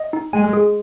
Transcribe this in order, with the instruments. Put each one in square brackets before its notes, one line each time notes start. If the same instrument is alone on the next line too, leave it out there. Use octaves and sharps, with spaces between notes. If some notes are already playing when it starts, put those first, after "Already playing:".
Already playing: [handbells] D#5
D#4
[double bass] G#3 [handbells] G#5
[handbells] G#4